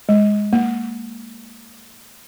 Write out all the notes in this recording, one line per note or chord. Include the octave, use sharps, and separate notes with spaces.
G#3
A#3